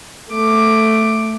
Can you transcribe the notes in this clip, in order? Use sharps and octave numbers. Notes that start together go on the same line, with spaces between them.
A3 D6